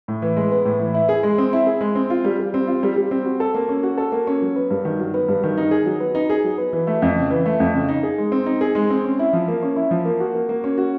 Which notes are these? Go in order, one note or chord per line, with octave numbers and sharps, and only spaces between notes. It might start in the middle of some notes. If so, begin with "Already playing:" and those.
A2
E3
G#3
B3
A2
E3
E4
G#4
G#3
C4
E4
G#4
G#3
C4
F4
G3
G3
C4
F4
G3
G3
C4
F#4
A4
A#3
C#4
F#4
A4
A#3
C#4
F#3
B3
G2
D#3
F#3
B3
G2
D#3
D#4
G#4
F#3
B3
D#4
G#4
F#3
B3
E3
A3
F2
C#3
E3
A3
F2
C#3
D#4
G#4
G#3
C4
D#4
G#4
G#3
C4
C#4
E4
F3
A#3
C#4
E4
F3
A#3
F#4
A#3
A#3
C#4
F#4